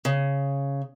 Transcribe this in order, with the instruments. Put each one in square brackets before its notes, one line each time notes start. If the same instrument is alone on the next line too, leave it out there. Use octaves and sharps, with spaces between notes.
[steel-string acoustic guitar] C#3